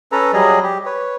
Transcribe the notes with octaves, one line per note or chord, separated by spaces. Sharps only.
C#4 A4 B4 A#5
F#3 G3 G#4 D#5
G4
B4 C#5